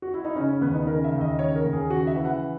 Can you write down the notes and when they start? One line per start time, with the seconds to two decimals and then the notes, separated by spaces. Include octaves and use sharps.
0.02 F#4
0.14 E4
0.25 D#4
0.35 C#3 C#4
0.48 C#4
0.61 D#2 B3
0.74 D#4
0.87 C#3 A#4
1.04 E5
1.12 D#2
1.21 D#5
1.38 C#3 C#5
1.55 A#4
1.64 D#2
1.73 G#4
1.90 C#3 F#4
2.07 E5
2.15 E3
2.25 F#5